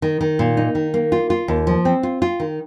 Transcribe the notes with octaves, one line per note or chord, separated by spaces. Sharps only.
D#3
D#3
A#2
D#4
D#3
A#3
F4
F4
D#2
F3
C4
F4
F4
D#3